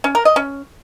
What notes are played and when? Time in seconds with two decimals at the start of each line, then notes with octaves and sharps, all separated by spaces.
0.04 C#4
0.15 A#4
0.25 D#5
0.36 C#4